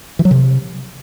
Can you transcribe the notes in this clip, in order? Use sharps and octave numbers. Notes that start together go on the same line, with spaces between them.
E3
F#3
C3